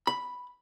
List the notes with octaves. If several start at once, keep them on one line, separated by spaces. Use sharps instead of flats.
B5